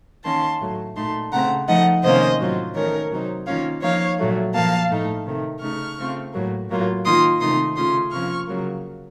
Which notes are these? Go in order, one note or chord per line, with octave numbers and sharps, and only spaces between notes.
D#3 A#3 C#4 A5 C6
A2 F#3 A3
A#2 A3 D#4 A5 C6
C#3 A3 C4 F#5 A#5
F3 A3 D#4 D#5 F#5
C3 D#3 A#3 C#4 C5 D#5
A2 F#3 C4 F4
D#3 A3 C#4 A#4 C#5
C3 F#3 C4 D#4
D#3 A#3 C#4 F4 C#5 F5
F3 A#3 D#4 C#5 F5
A#2 F#3 A3
A#2 F3 A#3 F5 A5
A2 A3 D#4
C3 D#3 A3
C#3 A3 D#4 C#6 F6
C#3 A3 C4 F4
A2 F#3 A#3
A2 F#3 A#3 F4
D#3 A#3 F4 C6 D#6
C3 D#3 A3 D#4 C6 D#6
C#3 A3 C#4 F4 C6 D#6
C3 F3 A#3 C#4 F4 C#6 F6
C#3 F#3 A#3